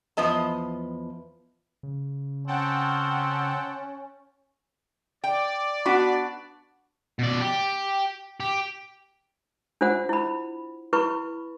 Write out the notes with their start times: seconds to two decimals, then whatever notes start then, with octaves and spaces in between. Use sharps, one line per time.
0.17 E2 F3 B3 D#5 A5
1.83 C#3
2.47 C4 C#4 F#5 G5 A5
5.24 D5 G5
5.86 B3 D4 F#4 F#5 B5
7.19 B2 D5
7.41 G4
8.40 G4
9.81 D4 F4 C5 F#5
10.09 E4 B5
10.93 E4 B4 B5 C#6